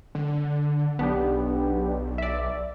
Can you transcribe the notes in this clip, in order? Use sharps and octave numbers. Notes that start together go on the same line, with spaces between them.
D3
B1 B3 D4 G4
D5 E5